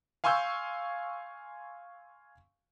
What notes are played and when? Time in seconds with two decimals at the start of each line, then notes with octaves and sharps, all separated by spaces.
0.24 F5 G#5 C6 C#6 E6 G6